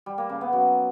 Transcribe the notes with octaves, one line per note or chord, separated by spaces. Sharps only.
G3
A#3
C#3
B3
F#3